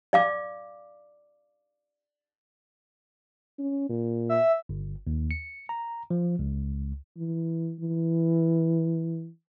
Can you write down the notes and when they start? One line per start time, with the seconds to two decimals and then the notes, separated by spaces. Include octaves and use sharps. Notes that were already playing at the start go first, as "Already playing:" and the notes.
0.13 D5 F5 D6
3.59 C#4
3.89 A#2
4.29 E5
4.69 G1
5.07 D#2
5.31 C#7
5.69 A#5
6.10 F3
6.39 C#2
7.17 E3
7.80 E3